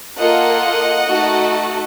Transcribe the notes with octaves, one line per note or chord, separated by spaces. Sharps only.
A#3 F4 A4 D#5 F#5
A3 D#4 F#4 A4